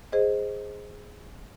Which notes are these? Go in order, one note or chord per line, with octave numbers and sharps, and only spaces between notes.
G#4 C5 D#5